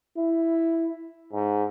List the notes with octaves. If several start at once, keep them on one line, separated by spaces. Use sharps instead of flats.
E4
G#2